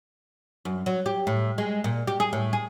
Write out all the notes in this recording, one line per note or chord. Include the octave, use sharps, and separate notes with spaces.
F#2
F#3
G4
A2
G#3
A#2
G4
G#4
A2
G#4